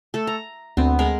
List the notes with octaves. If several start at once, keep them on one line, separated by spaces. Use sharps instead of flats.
A3 A4
A#5
D2 B3 C4
G#3 A#4 B5